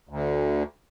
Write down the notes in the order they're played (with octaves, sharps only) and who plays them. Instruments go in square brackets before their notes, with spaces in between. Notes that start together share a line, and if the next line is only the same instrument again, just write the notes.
[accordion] D2